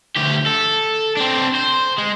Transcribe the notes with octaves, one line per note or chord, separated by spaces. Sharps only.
D2 G4
A4
C4 D4
C5
G#3